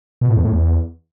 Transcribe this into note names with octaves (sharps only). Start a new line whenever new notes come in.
B2
A2
E2
A2
E2